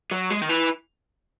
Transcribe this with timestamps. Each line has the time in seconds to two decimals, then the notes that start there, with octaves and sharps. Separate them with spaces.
0.11 F#3
0.30 G#3
0.42 D#3
0.49 E3